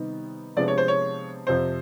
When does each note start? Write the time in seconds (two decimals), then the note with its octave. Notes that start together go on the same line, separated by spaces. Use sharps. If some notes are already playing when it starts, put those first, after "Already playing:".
Already playing: C3 D#3 G3 B3 D#4
0.57 C3 F3 G#3 B3 D4 D5
0.68 C#5
0.78 C5
0.88 C#5
1.47 F2 C3 F3 C5